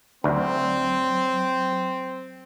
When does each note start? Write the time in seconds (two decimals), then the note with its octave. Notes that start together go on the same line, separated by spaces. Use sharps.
0.24 D2 F#3 C4